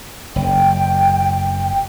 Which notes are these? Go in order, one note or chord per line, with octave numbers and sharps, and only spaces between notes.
F#1 G5